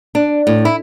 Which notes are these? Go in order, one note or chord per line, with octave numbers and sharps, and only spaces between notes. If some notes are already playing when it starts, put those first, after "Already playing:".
D4
A2
E4